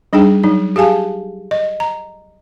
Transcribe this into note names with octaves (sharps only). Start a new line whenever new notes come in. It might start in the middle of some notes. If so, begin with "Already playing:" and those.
G3 D4 D#4 G#4 G5
F#3 D#4
G4 G#4 F5 G#5 A5
D#5
A#5